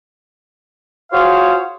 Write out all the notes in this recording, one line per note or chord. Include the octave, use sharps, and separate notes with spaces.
F4 F#4 G#4 C5 C#5 F5